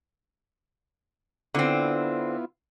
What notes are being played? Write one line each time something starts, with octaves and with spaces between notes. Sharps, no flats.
D3 B3 C4 E4 F4